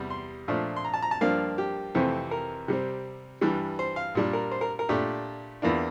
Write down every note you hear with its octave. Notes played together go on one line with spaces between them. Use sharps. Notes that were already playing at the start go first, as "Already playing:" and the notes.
Already playing: E2 C3 G3
C6
A#2 F3 A3 D4
C6
A#5
A5
A#5
A5
G2 F3 A#3 D4 F5
G4
F2 C3 E3 A3 C4
A#4
C3 G3 C4
G2 E3 G3
C5
F5
A#2 G3 D4
A#4
C5
A#4
A#4
A#2 A3 D4 G4
E2 E3 A#3 D4 F4